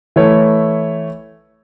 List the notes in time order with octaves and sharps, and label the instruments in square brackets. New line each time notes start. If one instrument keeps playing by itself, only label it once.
[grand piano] E3 A3 E4 C#5